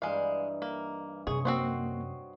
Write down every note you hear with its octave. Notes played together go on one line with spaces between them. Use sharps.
G2 E3 G#3 D#4 F5
A#3
F#2 C3 G#4 C#5 D#5 C#6
A#3 C4 F#4 C5